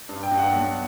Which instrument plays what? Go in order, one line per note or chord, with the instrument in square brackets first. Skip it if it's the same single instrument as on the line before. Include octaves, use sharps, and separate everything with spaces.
[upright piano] G2
G5
G2
F#5
B1